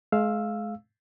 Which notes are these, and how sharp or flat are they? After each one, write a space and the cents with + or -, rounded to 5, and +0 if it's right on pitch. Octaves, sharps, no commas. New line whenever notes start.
G#3 +35 F5 +0 E6 +0